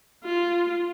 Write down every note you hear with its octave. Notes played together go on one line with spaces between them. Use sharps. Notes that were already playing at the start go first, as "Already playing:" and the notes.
F4